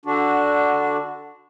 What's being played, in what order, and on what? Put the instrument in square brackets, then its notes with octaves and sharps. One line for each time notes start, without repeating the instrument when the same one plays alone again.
[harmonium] D3 D4 F#4